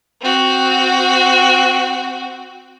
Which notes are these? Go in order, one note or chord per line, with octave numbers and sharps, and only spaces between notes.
C4 F#4